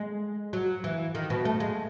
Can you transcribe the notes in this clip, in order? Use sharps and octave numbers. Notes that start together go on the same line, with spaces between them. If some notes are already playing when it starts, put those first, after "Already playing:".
Already playing: G#3
F#3
E3
D#3
B2
A3
G#3